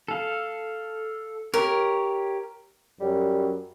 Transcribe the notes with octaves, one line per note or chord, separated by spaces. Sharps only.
A4 F5
G4 A#4 C#5
F#2 G3